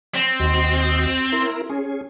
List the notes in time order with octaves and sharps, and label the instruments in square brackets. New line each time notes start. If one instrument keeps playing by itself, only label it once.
[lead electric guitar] C4
[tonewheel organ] D#2 F#4 D#5
E4 A#4
C#4 G#4